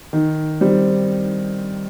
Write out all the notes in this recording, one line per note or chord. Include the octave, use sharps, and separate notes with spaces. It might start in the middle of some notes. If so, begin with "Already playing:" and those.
D#3
G3 C4